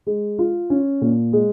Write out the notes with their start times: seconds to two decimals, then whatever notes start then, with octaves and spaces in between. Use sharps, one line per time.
0.07 G#3
0.39 F4
0.70 C#4
1.01 A#2
1.33 G#3